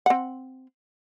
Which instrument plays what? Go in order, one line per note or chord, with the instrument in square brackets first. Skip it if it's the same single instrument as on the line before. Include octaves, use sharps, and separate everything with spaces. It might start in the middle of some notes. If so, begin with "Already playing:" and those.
[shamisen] C4 F#5